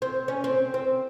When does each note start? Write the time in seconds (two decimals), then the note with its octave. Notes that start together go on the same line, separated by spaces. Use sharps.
0.02 C4
0.28 C#4
0.44 C4
0.74 C4